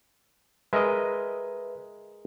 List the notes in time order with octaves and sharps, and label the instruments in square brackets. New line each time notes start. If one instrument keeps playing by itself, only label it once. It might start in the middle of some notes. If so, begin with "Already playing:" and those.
[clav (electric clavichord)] G#3 A#4 D#5 [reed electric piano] B4 E5